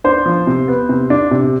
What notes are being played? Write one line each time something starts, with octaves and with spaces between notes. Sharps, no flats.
D4 C5
F3
C3
B3
C3
D4
C3